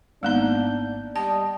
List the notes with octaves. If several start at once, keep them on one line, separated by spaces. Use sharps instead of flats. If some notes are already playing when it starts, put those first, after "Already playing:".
G#1 A#3 B3 D4 D#4 G6
G3 D#5 A5